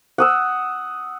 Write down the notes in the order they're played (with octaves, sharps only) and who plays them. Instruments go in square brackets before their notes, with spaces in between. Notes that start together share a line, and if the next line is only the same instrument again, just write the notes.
[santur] F#5 D#6 E6